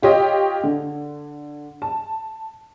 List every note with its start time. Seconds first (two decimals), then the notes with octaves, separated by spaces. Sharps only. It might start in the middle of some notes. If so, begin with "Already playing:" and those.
0.02 F4 G4 C#5 D#5
0.64 D3
1.82 A5